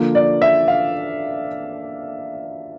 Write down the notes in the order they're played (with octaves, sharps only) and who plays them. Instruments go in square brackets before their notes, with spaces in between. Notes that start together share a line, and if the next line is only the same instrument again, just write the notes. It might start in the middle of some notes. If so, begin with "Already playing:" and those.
Already playing: [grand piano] D3 F3 A#3
D5
E5
F5